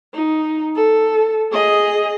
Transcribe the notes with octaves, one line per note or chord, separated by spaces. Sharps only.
D#4
A4
G#4 D#5